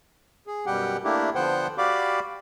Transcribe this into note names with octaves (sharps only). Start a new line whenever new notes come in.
G#4
F#2 B2 G3 G4 F#5 G5
A3 A#3 D4 E4 G4
D3 F3 B3 C5 F#5 G5
F#4 G4 D5 F5 B5 D6